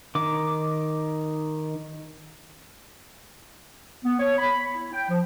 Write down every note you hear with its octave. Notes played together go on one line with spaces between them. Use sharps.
D#3 D6
B3
C#5
B5
E4
G5
F3